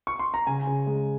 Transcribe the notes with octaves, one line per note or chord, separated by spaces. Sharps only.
C#6
C6
A#5
C#3 G#5
C#3
G#3